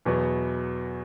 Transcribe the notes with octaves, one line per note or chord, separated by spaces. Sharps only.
E2 B2 F#3 B3